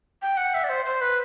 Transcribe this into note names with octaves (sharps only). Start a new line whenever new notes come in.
G5
F#5
E5
D5
C5
C5
B4